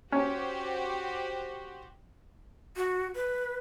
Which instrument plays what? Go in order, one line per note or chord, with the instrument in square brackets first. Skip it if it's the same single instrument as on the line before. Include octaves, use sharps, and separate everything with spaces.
[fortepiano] C#4 [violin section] F#4 G4 C5
[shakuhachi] F#4
B4